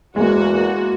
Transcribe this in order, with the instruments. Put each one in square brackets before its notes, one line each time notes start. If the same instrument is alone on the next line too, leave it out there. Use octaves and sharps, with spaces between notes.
[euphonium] E2 [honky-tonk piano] G#3 A#3 [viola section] F#4